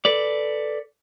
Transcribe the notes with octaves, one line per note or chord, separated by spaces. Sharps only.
A4 B4 D5